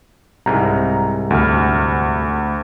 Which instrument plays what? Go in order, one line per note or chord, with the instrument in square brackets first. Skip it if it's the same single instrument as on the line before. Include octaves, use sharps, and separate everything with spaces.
[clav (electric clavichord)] C2 G#2 [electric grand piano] A#5
[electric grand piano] D2 F6